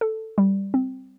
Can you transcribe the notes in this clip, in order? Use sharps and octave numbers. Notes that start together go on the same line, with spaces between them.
A4
G3
C4